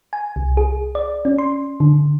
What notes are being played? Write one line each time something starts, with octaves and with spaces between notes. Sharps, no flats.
G#5
C2
G#4
D5
C#4
C6
D3